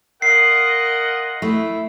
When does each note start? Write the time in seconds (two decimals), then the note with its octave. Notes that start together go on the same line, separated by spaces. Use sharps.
0.22 F4 A#4 D#5 F#5 C7
1.42 A3 E4